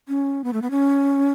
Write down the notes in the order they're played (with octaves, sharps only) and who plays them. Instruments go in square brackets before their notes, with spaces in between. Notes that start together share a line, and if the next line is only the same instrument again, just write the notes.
[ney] C#4
B3
A3
B3
C#4